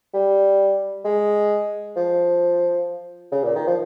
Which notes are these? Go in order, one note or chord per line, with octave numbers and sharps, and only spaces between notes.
G3
G#3
F3
C#3
A#2
D#3
F3